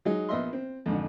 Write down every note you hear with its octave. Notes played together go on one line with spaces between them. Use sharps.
F#3 G#3 D#4
A#1 B3 D#5 E5 C6
C4
F2 G#2 D3